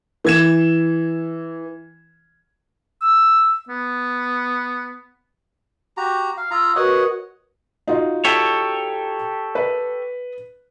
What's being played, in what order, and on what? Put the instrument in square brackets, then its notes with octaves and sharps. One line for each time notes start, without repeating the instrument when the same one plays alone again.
[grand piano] E3 G#6 E7
[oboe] E6
B3
[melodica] F#4 G4 A#5
F5
[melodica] F4 A#5 [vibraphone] D#6 E6
[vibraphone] F#4 A#4 B4 [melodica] C#5 D#5 F#5
[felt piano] D#4 F4 F#4
[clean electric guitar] G4 A4 C#5
[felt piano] B4